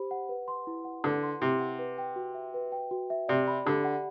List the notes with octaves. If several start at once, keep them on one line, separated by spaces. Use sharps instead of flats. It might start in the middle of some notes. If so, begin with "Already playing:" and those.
Already playing: G4 C5 B5
F#5
B4
C6
E4
F#5
D3 B4
C6
C3 E4
F#5
B4
G5
F#4
E5
B4
G5
F#4
E5
C3 D5
B5
D3 G4
F#5